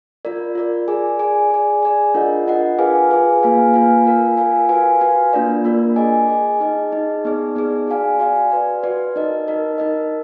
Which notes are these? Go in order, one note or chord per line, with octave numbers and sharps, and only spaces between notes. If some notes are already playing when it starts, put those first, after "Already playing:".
F4 A#4 D5
F4 A#4 D5
G#4 D5 G#5
G#4 D5 G#5
G#4 D5 G#5
G#4 D5 G#5
D4 F4 A#4 D#5 F#5
D4 F4 A#4 D#5 F#5
F4 G#4 B4 F5 G#5
F4 G#4 B4 F5 G#5
A#3 F4 B4 F5 G#5
A#3 F4 B4 F5 G#5
F4 A#4 F5 G#5
F4 A#4 F5 G#5
F#4 B4 F5 G#5
F#4 B4 F5 G#5
A#3 D4 F4 A#4 D5
A#3 D4 F4 A#4 D5
G#4 D#5 G#5
G#4 D#5 G#5
D#4 G#4 D#5
D#4 G#4 D#5
B3 D#4 G#4 D5
B3 D#4 G#4 D5
F#4 D5 F5 G#5
F#4 D5 F5 G#5
F#4 B4 D5
F#4 B4 D5
D#4 A#4 D#5
D#4 A#4 D#5
D#4 A#4 D#5